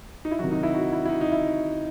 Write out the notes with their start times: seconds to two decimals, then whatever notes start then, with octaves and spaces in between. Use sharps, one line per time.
0.25 D#4
0.31 E4
0.39 C3 D#3 F#3 F#4
0.52 D#4
0.63 E4
0.75 F#4
0.93 E4
1.05 E4
1.09 D#4
1.21 D#4
1.32 E4